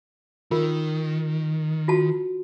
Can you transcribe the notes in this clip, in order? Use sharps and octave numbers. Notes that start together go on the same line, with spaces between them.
D#3 F4 A#4
F4 F#4 A5